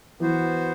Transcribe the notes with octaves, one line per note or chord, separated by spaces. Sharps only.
E3 B3 F#4 C5